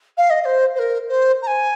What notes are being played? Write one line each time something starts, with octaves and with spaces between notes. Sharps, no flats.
F5
D#5
D#5
C5
C5
A#4
C5
A#5
G#5